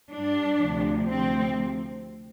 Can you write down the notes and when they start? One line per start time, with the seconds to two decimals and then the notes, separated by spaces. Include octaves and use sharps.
0.12 G2 G3 D4
0.61 D2 C3 F3
1.11 D2 C3 F3 C4